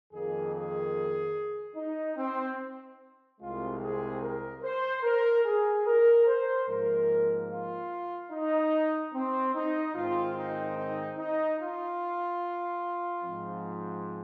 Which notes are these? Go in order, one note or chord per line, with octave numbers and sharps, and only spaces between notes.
F2 D#3 A#3 G#4
G#4
D#4
C4
C2 C3 G#3 C4 F4
G#4
A#4
C5
A#4
G#4
A#4
C5
G#2 F3 A#3 A#4
F4
D#4
C4
D#4
G#2 D#3 C4 F4
D#4
D#4
D#4
F4
G#2 F3 C4